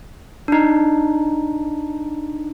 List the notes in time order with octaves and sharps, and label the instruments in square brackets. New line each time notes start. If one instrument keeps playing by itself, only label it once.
[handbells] D4 D#4